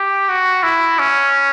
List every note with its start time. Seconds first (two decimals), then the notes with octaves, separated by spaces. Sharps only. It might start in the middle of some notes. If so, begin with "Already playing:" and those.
Already playing: G4
0.29 F#4
0.63 E4
0.99 C#4